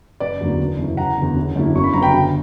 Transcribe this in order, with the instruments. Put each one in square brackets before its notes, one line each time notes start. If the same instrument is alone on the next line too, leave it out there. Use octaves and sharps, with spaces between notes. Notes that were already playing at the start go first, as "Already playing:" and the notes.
[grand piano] F#1 B4 D5
E2 D3 F#3 A#3
F#1
F#2 C#3 E3
F#1 F#5 A#5
E2 D3
F#1
F#2 D3 A#3 E4
G1 C#6
B5
F#2 C#3 F#3 B3 A#5
G5 B5
G1